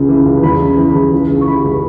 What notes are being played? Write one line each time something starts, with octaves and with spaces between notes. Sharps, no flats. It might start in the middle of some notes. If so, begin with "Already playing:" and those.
Already playing: C#2 C#3
E3
C#2
E2 B5
C#3
E3
E2
C#2
C#3
C#6
E3 B5
C#2